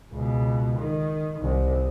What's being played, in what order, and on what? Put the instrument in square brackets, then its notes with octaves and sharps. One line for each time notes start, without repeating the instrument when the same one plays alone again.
[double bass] C#2 B2
D#3
C2